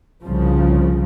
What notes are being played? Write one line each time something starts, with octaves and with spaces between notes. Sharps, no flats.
C2 C#3 F3